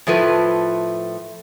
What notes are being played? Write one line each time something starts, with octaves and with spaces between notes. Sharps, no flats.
A2 F3 A3 B4